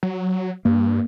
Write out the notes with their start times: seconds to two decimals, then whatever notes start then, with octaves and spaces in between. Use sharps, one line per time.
0.03 F#3
0.65 G2 A#3